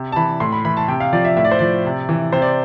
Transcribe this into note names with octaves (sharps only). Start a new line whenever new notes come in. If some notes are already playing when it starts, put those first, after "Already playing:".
Already playing: C3
A5
E3 B5
A2 C6
B5
E3 B5
A5
C3 G5
F5
F3 D5
E5
A2 E5
D5
C5
F3 D5
C3
E3
C3 C5
D5